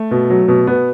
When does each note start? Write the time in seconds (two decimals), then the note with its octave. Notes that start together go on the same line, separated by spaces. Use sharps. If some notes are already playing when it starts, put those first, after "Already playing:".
Already playing: A3
0.11 B2
0.30 F#3
0.48 B2
0.67 B2 B3